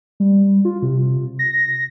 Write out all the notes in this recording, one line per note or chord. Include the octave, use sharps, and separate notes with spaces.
G3
F4
C3
A#6